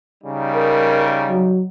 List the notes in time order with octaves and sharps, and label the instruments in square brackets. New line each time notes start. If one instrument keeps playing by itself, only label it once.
[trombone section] C#3 G3 D#4
[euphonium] A#4
F#3